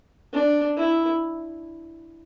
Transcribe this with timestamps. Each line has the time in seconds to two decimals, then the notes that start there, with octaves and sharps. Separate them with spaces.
0.33 D4
0.77 E4